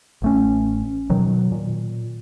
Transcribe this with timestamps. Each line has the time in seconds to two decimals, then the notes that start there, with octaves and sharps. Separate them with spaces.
0.22 A1 A3 C#4
1.10 B2 D#3 F#3
1.52 A#2